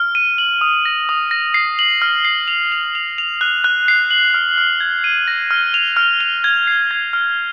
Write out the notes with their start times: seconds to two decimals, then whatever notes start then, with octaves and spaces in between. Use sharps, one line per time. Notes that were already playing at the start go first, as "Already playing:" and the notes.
Already playing: F6
0.15 D#7
0.38 F#7
0.61 D#6
0.85 A#6
1.09 D#6
1.31 A#6
1.54 C7
1.79 F#7
2.02 F6
2.25 C7
2.48 F7
2.72 F7
2.95 F7
3.18 F7
3.41 F#6
3.64 F#6
3.88 C7
4.11 F#7
4.34 F6
4.58 F6
4.80 G#6
5.04 D#7
5.28 A#6
5.51 F6
5.74 F7
5.97 F6
6.20 F7
6.44 G#6
6.67 C7
6.91 G#6
7.13 F6